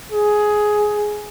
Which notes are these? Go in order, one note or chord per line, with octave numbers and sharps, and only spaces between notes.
G#4